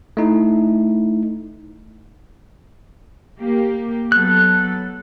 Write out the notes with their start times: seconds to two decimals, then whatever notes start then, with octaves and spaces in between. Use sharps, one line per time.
0.17 A3 D#4 E4
3.39 A#3 G4
4.12 F#3 B3 A4 F#6